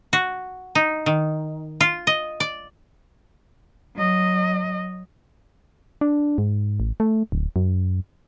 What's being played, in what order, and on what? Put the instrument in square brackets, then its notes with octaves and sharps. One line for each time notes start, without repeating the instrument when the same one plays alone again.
[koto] F#4
D#4
D#3
F4
D#5
D5
[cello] F#3 D#5
[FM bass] D4
G#2
A1
A3
D1
F#2